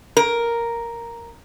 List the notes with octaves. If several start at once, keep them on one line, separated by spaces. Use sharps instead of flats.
A#4